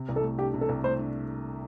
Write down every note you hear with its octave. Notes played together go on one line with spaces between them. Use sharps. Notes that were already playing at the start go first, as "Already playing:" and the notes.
Already playing: C3
C2
A4
A3
D4 G4
C3
A4
C2
A3 C5
D4